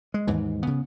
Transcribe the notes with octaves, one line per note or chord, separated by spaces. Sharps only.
G#3
D#2 G#2 E3
C#3 B3